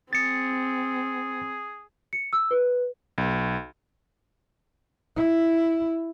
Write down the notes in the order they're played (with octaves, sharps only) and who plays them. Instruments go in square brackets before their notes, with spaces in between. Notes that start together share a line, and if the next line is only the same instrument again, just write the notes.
[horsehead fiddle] C4 [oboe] G#4 [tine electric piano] A6 C#7
[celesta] C#7
E6
B4
[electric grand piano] B1
[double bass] E4